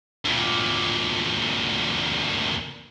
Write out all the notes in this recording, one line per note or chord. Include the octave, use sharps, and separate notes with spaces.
D2 A#2